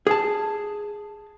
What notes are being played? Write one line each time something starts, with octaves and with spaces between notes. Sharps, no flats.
G#4 A5